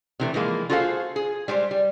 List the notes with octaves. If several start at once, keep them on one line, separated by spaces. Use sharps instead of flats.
C3 E3 A3
E3 F3 G#3 A#3
F4 F#4 G#4 A4 C5 F5
G#4
G3 G#3 G4 C5
G3